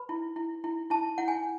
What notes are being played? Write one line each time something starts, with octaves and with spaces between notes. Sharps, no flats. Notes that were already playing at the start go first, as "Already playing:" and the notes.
Already playing: B4 B5
E4
E4
E4
E4 A5
E4 F#5
G#5